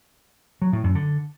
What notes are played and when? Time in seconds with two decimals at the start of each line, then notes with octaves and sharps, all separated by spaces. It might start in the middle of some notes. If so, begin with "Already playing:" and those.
0.62 F#3
0.73 A2
0.84 F#2
0.95 D3